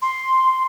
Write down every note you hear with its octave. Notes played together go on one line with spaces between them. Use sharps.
C6